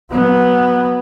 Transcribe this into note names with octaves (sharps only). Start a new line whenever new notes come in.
F#3 B3